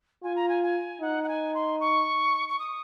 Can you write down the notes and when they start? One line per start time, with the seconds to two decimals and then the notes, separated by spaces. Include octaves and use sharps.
0.23 F4 G#5
0.36 A#5
0.49 G#5
0.63 G#5
1.01 D#4 F#5
1.23 F#5
1.28 G#5
1.54 C6
1.80 C#6
2.48 C#6
2.59 D#6